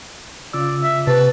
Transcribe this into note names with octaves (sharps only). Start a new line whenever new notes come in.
C#3 F4 D5 E6
E5
C3 B4 A5